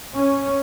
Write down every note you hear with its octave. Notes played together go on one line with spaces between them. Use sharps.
C#4